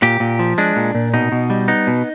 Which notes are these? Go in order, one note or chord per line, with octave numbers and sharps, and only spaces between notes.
A#2 G4
A#2
F3
G#3 D4
A#2
A#2
B2 D#4
B2
G3
B3 D#4
B2